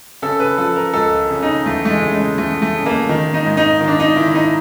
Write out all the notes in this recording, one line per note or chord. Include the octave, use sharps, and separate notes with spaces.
C#3 A4
B4
F3 A4
A#4
C#2 A4
C#3
D#4
E2 A3
A3
G#3
C#3
G#3
E2 A3
A3
C#3
A#3
D#3
D#4
G#2
D#4
D#3
D4
D#4
D#3 E4
D#4